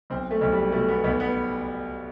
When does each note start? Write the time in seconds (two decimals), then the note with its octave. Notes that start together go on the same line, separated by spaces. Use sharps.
0.10 B1 C4
0.31 A3
0.41 B1
0.52 G3
0.72 B2 A3
0.89 B3
1.04 B1 B3
1.20 B3